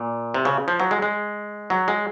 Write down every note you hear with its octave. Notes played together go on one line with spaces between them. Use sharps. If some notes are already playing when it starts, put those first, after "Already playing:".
Already playing: A#2
C3
C#3
F3
F#3
G#3
G#3
F#3
G#3